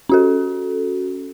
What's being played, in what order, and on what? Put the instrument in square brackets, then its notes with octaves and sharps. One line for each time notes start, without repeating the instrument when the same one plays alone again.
[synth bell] C#4 F#4 A4